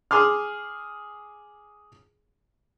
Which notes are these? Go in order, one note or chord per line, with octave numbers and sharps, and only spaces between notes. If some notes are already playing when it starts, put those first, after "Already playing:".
G#4 C6 D6 F6